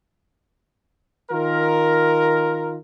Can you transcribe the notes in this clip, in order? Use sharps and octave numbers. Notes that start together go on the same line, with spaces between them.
D#3 F4 A#4